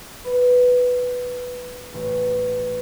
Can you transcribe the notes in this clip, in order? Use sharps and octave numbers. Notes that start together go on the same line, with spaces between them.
B4
A1